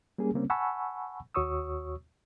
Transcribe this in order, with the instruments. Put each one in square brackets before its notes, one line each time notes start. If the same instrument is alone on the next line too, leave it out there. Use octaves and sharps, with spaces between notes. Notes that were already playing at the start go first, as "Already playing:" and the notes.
[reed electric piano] G3 A#3 C#4 G#4
C#3 G3 A#3 C4 C#4
F#5 G#5 A5 B5 C#6 E6
D#2 F#4 C#5 C#6 D#6 E6